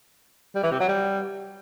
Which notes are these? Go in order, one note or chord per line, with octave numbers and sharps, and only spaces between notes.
G3
E3
C3
F#3
G3